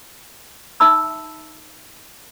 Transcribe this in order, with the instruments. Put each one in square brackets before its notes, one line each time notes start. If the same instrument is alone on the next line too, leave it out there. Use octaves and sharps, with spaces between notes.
[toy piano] D#4 E5 A5 B5 E6